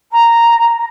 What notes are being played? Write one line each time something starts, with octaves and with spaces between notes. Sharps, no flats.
A#5